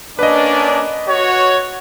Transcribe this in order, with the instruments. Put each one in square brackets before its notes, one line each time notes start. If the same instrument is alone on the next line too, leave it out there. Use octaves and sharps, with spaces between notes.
[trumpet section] A#3 C#4 D4 [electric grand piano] B4 D#5
[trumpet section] F#4 C#5